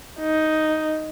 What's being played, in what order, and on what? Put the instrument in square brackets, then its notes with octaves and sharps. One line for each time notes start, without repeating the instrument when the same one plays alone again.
[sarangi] D#4